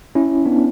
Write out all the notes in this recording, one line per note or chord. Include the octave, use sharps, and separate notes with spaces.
C#4 E4
B3 D4